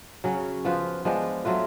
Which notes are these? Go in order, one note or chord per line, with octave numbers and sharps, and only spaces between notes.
C#3 F#3 C#4
F3 B3 F4 B4
F3 G#3 B3 D4
F#3 A3 F4 B4